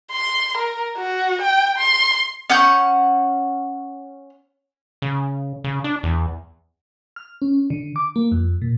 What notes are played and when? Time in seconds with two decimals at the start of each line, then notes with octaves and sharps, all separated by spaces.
0.11 C6
0.58 A#4
0.97 F#4
1.42 G5
1.78 C6
2.50 C#4 F#5 C#6 G6
5.02 C#3
5.64 C#3
5.84 D4
6.03 E2
7.16 F6
7.42 C#4
7.70 D3
7.96 D6
8.16 A#3
8.32 F2
8.62 A#2